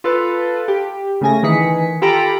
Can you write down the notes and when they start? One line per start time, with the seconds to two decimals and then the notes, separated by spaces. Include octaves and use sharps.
0.04 F4 A4 B4
0.68 G4
1.21 C#3 A3 G#5 A#6
1.43 D#3 E3 G#4 B6 C#7
2.02 F4 G4 A4 G5 A#5 B5